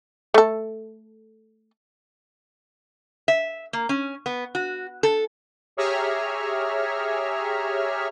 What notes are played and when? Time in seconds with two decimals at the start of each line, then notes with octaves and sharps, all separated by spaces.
0.34 A3 A4
3.28 E5
3.73 A#3
3.89 C#4
4.26 B3
4.55 F#4
5.03 A4
5.77 G4 G#4 C#5 E5 A#5 F6